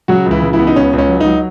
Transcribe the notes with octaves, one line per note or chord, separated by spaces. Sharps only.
C#3 F#3 F#4
C#2
E3 E4
C#3
E3 E4
B3
D#4
C#2 C#4
C#2
C#4
F#3
D#4
F#3